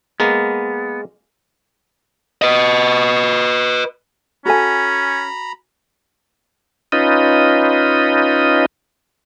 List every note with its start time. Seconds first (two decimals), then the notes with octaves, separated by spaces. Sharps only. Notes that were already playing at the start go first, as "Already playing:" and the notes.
0.20 G#3 A#3 B3 A#4
2.42 B4 D#5
4.46 C#4 F#4 A4 G#5 A#5 B5
6.92 C#4 D#4 F4 B4 D#5